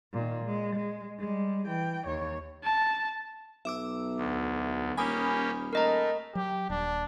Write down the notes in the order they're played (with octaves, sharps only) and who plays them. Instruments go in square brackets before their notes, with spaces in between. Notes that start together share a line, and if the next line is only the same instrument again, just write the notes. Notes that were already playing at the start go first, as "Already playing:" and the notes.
[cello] A#2 D#3
G#3
G#3
G3 G#3
E3 G5
D#2 C#5
[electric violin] A5
[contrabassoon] B1 [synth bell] E5 D6 E6
[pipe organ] D2
[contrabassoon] D#1 [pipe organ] A#3 C#4 G4 [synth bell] G#5 B5 D#6
[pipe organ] A3 [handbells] A#4 D#5 A#5
[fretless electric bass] F#3 [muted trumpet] G4
[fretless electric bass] D#1 [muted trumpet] D4